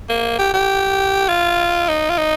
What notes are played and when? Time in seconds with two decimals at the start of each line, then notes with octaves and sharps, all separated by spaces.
0.09 A#3
0.38 G4
0.54 G4
1.28 F4
1.88 D#4
2.09 F4
2.18 D#4